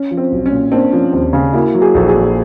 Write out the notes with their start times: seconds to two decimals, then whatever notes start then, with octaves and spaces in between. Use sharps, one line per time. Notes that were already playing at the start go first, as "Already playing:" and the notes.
Already playing: C#4
0.11 F3
0.17 C4
0.32 B1
0.46 C#4
0.52 A#2
0.72 A#3 C4 D4
0.92 F3 C#4
1.12 D#2 C4
1.33 C#3 C#4
1.53 A#3 E4 F#4
1.74 F#3
1.81 F#4 G#4
1.94 A#1 A4
2.08 F#4 G#4
2.15 A#2